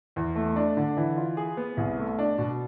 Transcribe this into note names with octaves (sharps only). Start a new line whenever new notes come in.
E2
A3
D4
D3
E3
F4
G#4
B3
C2
A3
D4
B2